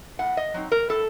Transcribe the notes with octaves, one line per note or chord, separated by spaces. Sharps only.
A2 F#5
D#5
F#3 C4 D#4
A#4
A2 A4